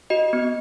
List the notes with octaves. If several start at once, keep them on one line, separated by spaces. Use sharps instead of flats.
F#4 D#5
B3